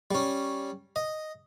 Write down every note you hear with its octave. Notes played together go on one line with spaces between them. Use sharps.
G3 C#4
D#5